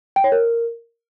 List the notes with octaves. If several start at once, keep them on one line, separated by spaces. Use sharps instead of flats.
G5
C#5
A#4